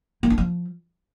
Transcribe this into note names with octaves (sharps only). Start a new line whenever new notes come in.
A#3
D4
F3